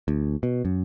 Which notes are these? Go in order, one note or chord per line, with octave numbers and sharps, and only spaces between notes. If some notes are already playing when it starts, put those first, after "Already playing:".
D2
B2
F#2